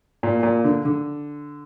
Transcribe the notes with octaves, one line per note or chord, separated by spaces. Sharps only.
A#2
A#2
D3
D3